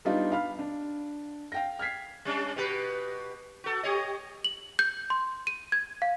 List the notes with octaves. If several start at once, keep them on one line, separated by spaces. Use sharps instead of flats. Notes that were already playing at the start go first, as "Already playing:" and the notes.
G3 B3 D4 D#4 F4
F5 B5 F6
D4
F5 G5 A#6
F6 G#6 B6 C7
G3 C#4 D4
B2 G4 B4
F#4 A4
G4 C#5 D#5
F#7
G6
C6
D#7
G#6
F5